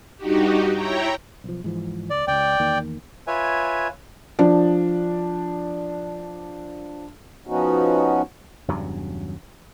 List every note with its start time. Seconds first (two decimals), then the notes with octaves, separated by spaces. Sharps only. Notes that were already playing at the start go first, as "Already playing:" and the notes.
0.17 G2 D#4 F#4 G4
0.72 E4 C#5 G5 A#5
1.44 B1 F3
1.64 G#2 E3 F3
2.10 C#2 D5
2.28 C#2 D5 G5
2.60 E2 D#3 A#3
3.27 F4 B4 C#5 E5 G#5
4.39 F3 D4
7.47 F3 B3 C#4 D#4 F#4
8.68 E2 G2 C#3 F#3